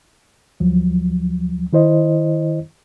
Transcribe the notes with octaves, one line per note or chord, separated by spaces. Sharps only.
D2 F3 F#3
D#3 E4 C5 D#5